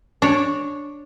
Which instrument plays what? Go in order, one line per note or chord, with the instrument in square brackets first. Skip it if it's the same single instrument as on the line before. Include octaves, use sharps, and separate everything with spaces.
[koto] D4 C#5